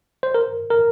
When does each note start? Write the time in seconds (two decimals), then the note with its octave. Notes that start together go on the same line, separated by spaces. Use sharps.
0.23 C5
0.35 A#4
0.70 A#4